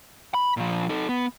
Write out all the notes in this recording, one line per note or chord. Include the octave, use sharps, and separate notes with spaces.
B5
A#2 F3
D#4 A4
B3